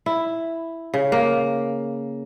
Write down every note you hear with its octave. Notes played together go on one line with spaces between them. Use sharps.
E4
C#3
A#3